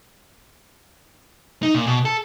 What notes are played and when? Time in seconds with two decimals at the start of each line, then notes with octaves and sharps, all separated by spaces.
1.63 D#4
1.75 A#2
1.86 B2
2.05 A4